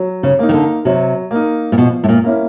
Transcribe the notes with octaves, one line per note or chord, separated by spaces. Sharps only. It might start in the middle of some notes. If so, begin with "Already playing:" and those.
Already playing: F#3
C#3
A#3 D#4
D#3
D3
C3 F#3
A#3 D#4
A#2
B2 F3
A2
A#2
A#3 C#4 E4